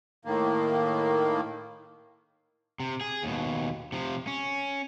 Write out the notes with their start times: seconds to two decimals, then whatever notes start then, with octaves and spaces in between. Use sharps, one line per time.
0.25 A2 D#3 A#3
2.80 C3
3.01 G#4
3.23 D#2 B2
3.92 C3 F3
4.27 C#4